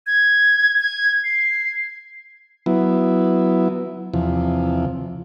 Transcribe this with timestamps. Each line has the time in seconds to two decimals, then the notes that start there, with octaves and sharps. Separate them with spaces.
0.07 G#6
0.80 G#6
1.24 C7
2.66 F#3 B3 E4
4.14 E2 C3 F3